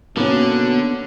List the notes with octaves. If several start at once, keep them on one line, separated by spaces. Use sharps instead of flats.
B2 D3 A#3 B3 C#4